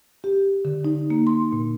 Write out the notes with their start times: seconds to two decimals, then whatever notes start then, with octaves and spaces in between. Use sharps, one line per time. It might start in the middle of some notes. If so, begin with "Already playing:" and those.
0.24 G4
0.65 D3
0.85 D#4
1.10 A#3
1.27 C6
1.52 A#2